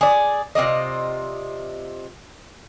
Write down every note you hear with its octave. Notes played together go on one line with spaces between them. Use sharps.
G#4 D5
C3 F4 D5 D#5